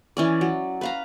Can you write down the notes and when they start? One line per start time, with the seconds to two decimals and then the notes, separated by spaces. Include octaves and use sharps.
0.17 E3 C#4 D5
0.41 F#3
0.81 B4 F5 A#5